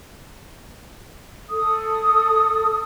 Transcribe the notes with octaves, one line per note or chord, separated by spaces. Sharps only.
A4 D#6